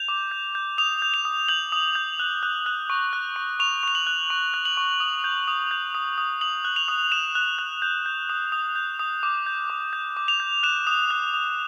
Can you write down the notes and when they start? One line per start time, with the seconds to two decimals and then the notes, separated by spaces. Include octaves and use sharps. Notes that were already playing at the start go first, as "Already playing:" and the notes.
Already playing: G6 F7
0.08 D6
0.31 G6
0.55 G6
0.78 D#6 F7
1.02 G6
1.14 F7
1.25 D#6
1.48 G6 F#7
1.72 D#6
1.95 G6
2.19 F#6
2.43 F#6
2.66 F#6
2.90 C#6
3.13 F#6
3.36 C#6
3.60 C#6 F7
3.83 C#6 F7
3.95 F#7
4.07 F#6
4.30 C#6
4.54 F#6
4.65 F#7
4.77 C#6
5.00 D#6
5.24 G6
5.48 D#6
5.71 G6
5.95 D#6
6.18 D#6
6.41 D#6 F#7
6.65 F#6
6.76 F7
6.88 D#6
7.12 D#6 E7
7.35 F#6
7.59 F#6
7.82 G6
8.06 G6
8.29 D#6
8.52 D#6
8.76 G6
8.99 D#6
9.23 D6
9.46 G6
9.70 D6
9.93 G6
10.17 D6
10.28 F7
10.40 G6
10.63 F#6 E7
10.87 D#6
11.10 F#6
11.34 D#6